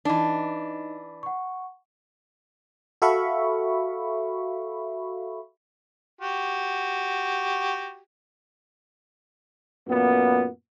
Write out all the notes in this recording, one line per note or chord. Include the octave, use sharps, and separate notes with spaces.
E3 D4 D#4 D#5
F#5 C#6
F#4 A4 E5 F5 B5 C#6
F#4 G4
F#2 A#2 B3